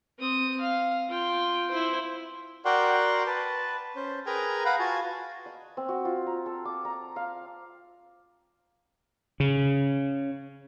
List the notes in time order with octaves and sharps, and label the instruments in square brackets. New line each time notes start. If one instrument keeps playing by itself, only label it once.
[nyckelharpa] C4 D#6
F5
F4 G5
E4 C5
[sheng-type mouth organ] F#4 A#4 D5 F#5 G5 C6
B4 A5
C#4 C5
G#4 A#4 B4 G5 G#5 A#5
B4 F5 F#5 A#5 B5
F4 F#4 G#5 A5
[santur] D#5
C4
F#4
F4
A#5
A4
D6
A#5
F5
[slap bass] C#3